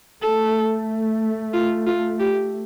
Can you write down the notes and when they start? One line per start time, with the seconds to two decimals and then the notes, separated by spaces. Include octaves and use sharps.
0.23 A3 A4
1.54 F4
1.87 F4
2.20 G4